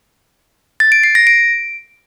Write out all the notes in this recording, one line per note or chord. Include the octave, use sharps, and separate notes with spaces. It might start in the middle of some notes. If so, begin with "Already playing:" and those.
A6
D7
C7
A#6
D7